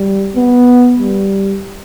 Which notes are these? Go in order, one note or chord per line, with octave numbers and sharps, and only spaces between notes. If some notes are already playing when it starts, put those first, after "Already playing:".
Already playing: G3
B3
G3